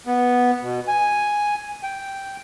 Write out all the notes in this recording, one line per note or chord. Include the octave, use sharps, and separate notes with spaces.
B3
B2
G#5
G5